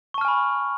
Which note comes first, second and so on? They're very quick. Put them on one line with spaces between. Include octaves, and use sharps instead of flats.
C#6 A5 F6 G#5 B5